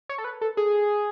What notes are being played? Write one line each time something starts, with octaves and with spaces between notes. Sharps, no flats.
C#5
A4
B4
A4
G#4